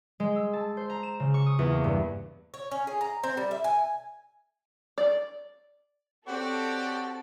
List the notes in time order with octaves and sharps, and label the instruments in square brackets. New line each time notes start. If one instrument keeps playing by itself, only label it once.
[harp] G#3
E6
A5
C5
A#5
E7
C#3
C#6
D#6
E2
A#3
G2
[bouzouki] C#5
C#4
G#4
A#5
C4
G3
E5
G#5
[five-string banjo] D5
[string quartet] C4 [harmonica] F#4 C#5 D5 [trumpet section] G4 F#5 [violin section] A4